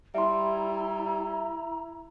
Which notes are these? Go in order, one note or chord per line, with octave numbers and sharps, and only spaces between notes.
G3 E4 E5 A#5 C6